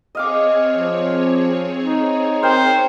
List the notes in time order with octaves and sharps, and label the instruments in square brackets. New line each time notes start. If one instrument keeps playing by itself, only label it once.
[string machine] C4 G#4 C#5 [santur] D#5 F5 D6
[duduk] F3
D#4
[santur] A#4 G5 [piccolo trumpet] C5